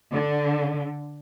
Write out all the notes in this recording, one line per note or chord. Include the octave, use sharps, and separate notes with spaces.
D3